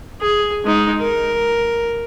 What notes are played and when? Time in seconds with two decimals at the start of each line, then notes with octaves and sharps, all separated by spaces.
0.21 G#4
0.65 G#3 D#4
1.01 A#4